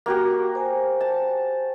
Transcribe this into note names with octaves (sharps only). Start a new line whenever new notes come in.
A#3 F#4 G4
C5 G#5
A5